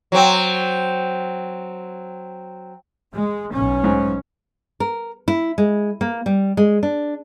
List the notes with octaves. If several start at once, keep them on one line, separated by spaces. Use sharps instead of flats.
F#3 C4
G#3
B1 C#4
G#2
A#4
E4
G#3
A#3
G3
G#3
D4